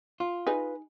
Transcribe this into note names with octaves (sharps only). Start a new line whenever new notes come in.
F4
D#4 G#4 B4